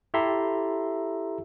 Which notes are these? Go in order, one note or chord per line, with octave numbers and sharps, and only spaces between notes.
E4 G4 A4 E5 A#5 C6